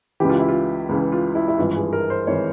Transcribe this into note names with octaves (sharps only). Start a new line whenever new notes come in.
C#2 C#3 E3 G4
F4
E4
F4
C#2 C#3 E3
F4
E4
E4
G#1 G2 E3 F4
G#4
A#4
C5
G#1 E3 C#5